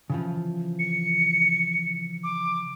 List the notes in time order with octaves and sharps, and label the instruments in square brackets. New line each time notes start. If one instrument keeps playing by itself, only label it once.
[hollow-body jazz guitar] C#3 E3 F3
[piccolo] C#7
D6